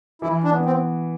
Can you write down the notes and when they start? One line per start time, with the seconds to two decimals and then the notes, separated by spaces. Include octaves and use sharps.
0.22 E3 E4
0.44 D4
0.51 B3
0.65 C4